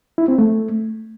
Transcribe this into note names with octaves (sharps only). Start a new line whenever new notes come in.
E4
C4
A3